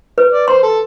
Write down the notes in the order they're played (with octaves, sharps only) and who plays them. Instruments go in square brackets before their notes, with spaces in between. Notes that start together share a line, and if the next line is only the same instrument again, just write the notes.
[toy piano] B4
[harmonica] D5
[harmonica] C5 [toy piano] C6
[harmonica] A4